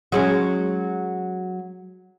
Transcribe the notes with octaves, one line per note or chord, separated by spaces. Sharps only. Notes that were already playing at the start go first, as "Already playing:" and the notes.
F#3 G#3 C#4